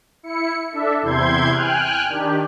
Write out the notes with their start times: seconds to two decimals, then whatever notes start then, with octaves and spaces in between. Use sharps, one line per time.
0.23 E4 C#7
0.71 D4 A4 E5
1.02 E2 C3 E4 C6 G6 G#6
1.50 G5 G#5 F6 F#6
2.09 D#3 D4 G4